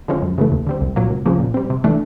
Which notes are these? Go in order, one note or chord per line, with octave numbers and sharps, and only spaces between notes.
D3 F3 G#3 C#4
F#2
C#3 E3 A3
D#2
D3 G3 C4
C2
A#2 F#3 A#3
C#2
C#3 F3 A#3
A#2
G3 C4
C3
E3 A3 D4